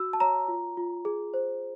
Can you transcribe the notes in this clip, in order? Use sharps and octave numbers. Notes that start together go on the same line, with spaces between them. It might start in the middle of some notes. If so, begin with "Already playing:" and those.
Already playing: F#4 E6
A5
C#5 A#5
F4
F4
G#4
C5